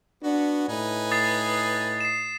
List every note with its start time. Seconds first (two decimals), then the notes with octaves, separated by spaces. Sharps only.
0.23 B3 D4 F#4
0.69 A2 D#4 B4 G#5
1.11 D#6 A6 C7
2.00 C7 E7